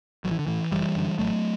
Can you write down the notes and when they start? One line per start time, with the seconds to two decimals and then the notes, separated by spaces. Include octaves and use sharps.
0.24 A1 F#3
0.31 E3
0.39 D3
0.47 A2 E3
0.72 F#1 E3 G3
0.96 F#2 D3
1.19 A1 F#3 A3